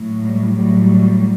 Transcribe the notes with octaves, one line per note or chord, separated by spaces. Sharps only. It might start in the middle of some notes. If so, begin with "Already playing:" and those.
Already playing: A2 F#3
G3
A2 F#3 G3